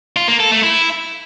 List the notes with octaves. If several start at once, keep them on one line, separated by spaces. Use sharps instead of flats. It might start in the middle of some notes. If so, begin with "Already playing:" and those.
F4
A#3
A4
A3
E4